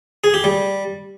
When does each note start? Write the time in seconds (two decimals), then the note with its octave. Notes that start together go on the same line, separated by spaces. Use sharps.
0.24 G#4
0.34 G4
0.44 G3